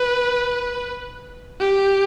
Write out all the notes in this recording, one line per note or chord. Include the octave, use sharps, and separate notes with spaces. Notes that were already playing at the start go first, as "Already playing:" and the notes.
Already playing: B4
G4